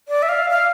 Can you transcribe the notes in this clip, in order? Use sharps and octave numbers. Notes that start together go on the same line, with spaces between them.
D5
E5
F5
F5